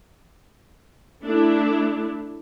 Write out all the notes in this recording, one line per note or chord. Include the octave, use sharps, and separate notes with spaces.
A3 D4 E4